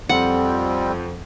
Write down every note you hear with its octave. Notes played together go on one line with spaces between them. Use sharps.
F2 G3 C4 F#5